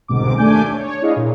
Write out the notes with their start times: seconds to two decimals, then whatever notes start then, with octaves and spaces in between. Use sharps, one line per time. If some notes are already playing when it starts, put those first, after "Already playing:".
0.08 G1 C2 G#2 B2 D6
0.38 D#2 A3 D4 G#5 D6 G6
0.74 C#5
1.02 D4 E4 G#4 D#5 F5
1.16 A#2